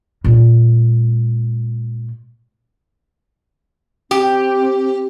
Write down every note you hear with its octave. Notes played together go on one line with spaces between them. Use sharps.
A#2 G#3
C4 G4